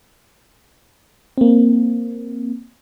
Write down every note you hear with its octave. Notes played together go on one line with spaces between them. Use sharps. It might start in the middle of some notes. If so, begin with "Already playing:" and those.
A#3 C4